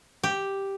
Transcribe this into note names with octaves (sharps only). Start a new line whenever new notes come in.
G4